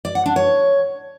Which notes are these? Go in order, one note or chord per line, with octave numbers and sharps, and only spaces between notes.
D5
F#5
D4
C#5